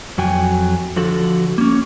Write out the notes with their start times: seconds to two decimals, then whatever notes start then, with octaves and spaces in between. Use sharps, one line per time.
0.18 F2 F#3 G5 G#5
0.96 D3 F3 F#4 A4
1.58 A#3 C#4